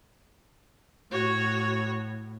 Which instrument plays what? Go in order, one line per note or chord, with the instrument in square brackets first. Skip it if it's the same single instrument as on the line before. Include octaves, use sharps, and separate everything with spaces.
[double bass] A2 [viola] F#4 C#5